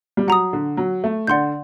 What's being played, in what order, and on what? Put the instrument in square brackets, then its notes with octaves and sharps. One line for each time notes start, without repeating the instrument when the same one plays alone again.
[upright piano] G3
[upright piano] F#3 [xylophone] F#5 A#5 D#6
[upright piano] D3
F#3
A3
[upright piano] D3 [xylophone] D5 F#5 C6 G6